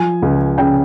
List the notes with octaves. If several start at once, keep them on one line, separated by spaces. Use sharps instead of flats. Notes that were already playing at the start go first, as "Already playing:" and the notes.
Already playing: F3 G#5
C#2
C#3 G5